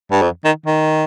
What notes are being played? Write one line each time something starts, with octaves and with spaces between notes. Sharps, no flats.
G2
F2
D#3
D#3